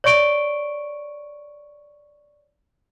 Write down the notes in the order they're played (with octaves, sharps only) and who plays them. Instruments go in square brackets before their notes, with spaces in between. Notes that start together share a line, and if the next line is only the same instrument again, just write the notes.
[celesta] C#5 D5 C#6 D7 G7